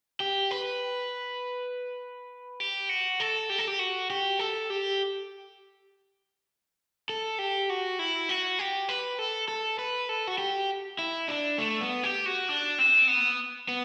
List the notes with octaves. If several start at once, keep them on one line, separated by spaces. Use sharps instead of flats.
G4
B4
G4
F#4
A4
G4
A4
G4
F#4
G4
A4
G4
A4
G4
F#4
E4
F#4
G4
B4
A4
A4
B4
A4
F#4
G4
E4
D4
A3
B3
G4
F#4
D4
C4
B3
B3